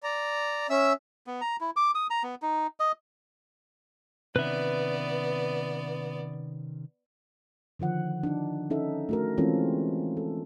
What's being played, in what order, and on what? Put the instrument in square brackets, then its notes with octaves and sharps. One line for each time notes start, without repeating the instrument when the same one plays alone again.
[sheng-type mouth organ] D5 A#5
C#4 E5 E6
[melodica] B3
A#5
E4
D6
D#6
A#5
B3
D#4
D#5
[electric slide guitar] C3 D#3 C#4 [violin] B3 D5 [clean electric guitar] B4 E5
[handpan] D3 D#3 F3 F#5
D4 D#4
C#4 D#4 A4 E5
A3 F#4 A#4
E3 G#3 C4 C#4 F4 A4
A4